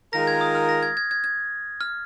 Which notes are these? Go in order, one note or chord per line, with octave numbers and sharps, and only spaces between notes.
D#3 G#3 F4 A#4 A#6
G#6
D#6
F6
A#6
G#6
G#6
G#6
G#6
F6